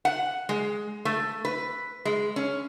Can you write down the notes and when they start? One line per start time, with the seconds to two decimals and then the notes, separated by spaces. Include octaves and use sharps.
0.05 F#5
0.49 G#3
1.05 A3
1.45 B4
2.05 G#3
2.36 C#4